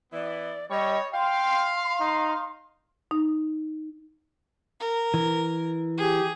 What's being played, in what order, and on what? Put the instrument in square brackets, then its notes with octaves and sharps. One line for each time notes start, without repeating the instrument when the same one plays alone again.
[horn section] E3 B3 [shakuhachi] D5
[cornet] G3 [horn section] C#5 [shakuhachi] D#5
[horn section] F5 [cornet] G5 [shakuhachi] C6
[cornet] D#4
[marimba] D#4
[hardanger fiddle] A#4
[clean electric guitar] E3
[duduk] G4 [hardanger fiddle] G#4